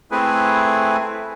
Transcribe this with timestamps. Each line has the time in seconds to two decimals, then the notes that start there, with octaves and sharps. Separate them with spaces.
0.11 A3 C4 E4 G#4 B4 G#5